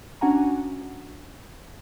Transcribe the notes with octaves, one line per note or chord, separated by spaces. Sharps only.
C#4 D4 F#4 F#5 G#5 A#5